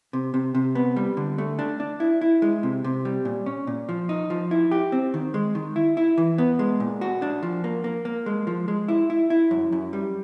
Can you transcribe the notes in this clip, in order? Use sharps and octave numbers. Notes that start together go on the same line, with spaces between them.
C3
C3
C3
B3
G3
D3
A3
D4
D4
E4
E4
G#3
C3
C3
G3
A#2
C#4
A#2
F3
D#4
F3
E4
G4
C4
D#3
G#3
D#3
E4
E4
E3
B3
G#3
A#2
F#4
D4
F3
A#3
A#3
A#3
G#3
F3
G#3
E4
E4
E4
F#2
F#2
G3